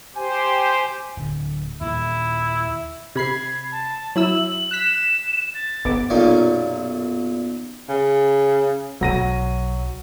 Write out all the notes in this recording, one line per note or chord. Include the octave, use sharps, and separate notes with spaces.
G4 C5 G#5
D1 D3
D#2 A#2 D#3 E4
C3 B5 G#6 C7
A5
F#3 E4 E6 F#7
F#6 B6 E7
A6
G1 B3 D6
B1 F#2 A#2 G3
C#3
B1 F#3 A#6 D#7